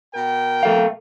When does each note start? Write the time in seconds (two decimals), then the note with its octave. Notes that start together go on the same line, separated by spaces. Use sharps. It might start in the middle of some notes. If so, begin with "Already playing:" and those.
0.14 B2 A#4 G5
0.63 A3 A4 F5